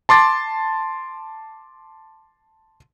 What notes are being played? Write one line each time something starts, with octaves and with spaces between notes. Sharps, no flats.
A5 C6 D6 A6